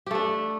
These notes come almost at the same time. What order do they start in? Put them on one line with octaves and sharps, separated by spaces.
G4 A3 D4